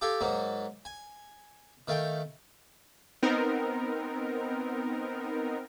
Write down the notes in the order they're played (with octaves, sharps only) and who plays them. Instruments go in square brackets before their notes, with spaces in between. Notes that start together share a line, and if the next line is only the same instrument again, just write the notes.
[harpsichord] G4 A4 F5 G#5
G#2 F#3 A#3
G#5
D#3 A3 F5 G5
[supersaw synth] B3 C4 D#4 A#4